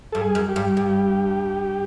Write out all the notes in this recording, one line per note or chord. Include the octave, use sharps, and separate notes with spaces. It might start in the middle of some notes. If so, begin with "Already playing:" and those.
G2 A4
G#4
F#2
G4
G2
G2